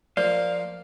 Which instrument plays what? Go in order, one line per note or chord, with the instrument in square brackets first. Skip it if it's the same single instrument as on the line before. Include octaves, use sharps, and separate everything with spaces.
[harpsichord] F3 A#3 [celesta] D5 [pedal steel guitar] F5